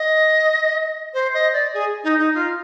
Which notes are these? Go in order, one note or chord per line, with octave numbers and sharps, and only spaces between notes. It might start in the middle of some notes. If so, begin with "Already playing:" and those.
Already playing: D#5
C5
D#5
D5
G#4
D#4
D#4
F4